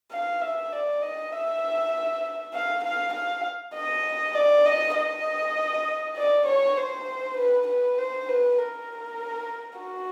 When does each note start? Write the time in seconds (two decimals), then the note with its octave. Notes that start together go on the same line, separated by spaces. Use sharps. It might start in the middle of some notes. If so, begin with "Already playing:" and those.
0.12 F5
0.41 E5
0.73 D5
1.02 D#5
1.32 E5
2.54 F5
2.84 F5
3.14 F5
3.75 D#5
4.35 D5
4.66 D#5
4.96 D#5
6.17 D5
6.47 C#5
6.77 C5
7.38 B4
7.67 B4
7.98 C5
8.29 B4
8.58 A#4
9.79 F#4